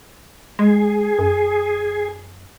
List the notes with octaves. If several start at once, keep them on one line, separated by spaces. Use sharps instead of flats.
G#3 G#4
F#2